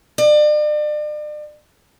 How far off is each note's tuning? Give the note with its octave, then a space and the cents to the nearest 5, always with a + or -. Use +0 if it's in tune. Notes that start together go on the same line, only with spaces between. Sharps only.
D5 +40